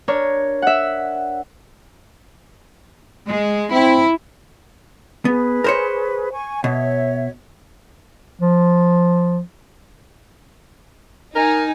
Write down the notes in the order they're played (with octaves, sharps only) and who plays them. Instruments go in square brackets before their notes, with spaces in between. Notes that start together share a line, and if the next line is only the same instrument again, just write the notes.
[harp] D4 A#4 C#5
E5 F#5
[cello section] G#3
[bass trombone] C4 [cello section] E4
[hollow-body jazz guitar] B3 [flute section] G#4 B4
[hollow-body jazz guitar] A#4 C5 C#5
[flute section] G#5 C#6
[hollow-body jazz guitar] B2 [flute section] C#5 E5
[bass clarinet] F3
[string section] D#4 [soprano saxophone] A#4 [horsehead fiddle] G#5